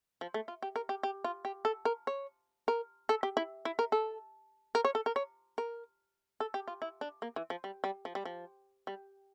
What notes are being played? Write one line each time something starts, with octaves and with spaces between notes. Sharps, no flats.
F3
A3
F4
G4
A#4
G4
G4
F4
G4
A4
A#4
C#5
A#4
A4
G4
E4
E4
A#4
A4
A#4
C#5
A4
A#4
C#5
A#4
A4
G4
F4
E4
D4
A#3
E3
F3
G3
G3
F3
G3
F3
G3